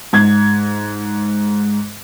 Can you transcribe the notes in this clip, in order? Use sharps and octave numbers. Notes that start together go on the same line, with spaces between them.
G#2 G#6